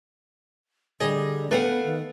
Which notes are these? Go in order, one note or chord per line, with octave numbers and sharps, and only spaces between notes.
D3 G3 G#4 D#5
A3 B3 B4 F5 F#5
D#3